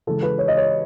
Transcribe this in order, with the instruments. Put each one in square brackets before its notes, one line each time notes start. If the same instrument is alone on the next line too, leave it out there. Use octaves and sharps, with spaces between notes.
[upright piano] C#3 E3 G#3 A4
B4
C#5
D#5
C#5